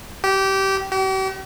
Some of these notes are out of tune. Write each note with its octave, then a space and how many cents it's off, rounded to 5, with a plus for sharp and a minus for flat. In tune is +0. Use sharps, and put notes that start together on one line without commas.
G4 -20
G4 -45